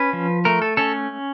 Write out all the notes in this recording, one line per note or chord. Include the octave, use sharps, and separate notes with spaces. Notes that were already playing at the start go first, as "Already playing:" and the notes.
Already playing: C#4 B4
F3
A3 A#4
A4
C#4 A4